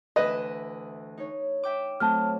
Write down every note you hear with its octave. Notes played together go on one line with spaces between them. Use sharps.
D2 E3 B4 D#5 E5
D#4 C#5
E5 G5 D6
F#3 A3 C4 A5 F6